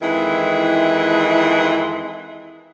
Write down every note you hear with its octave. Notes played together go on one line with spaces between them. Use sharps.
F2 D#3 E3 G#3 E4